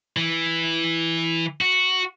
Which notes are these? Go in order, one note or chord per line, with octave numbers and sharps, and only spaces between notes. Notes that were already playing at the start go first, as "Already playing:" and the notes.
E3
F#4